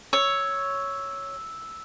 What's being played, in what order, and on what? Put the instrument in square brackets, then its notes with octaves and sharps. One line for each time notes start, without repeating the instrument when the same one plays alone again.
[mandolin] C#5 [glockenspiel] E6